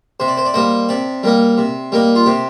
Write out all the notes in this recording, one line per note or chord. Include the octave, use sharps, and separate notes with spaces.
C3 C5
D5
C5
D5
G3 A#3 D#4 C5
C3 D5
G3 A#3 D#4
C3
G3 A#3 D#4
F4
C3 G4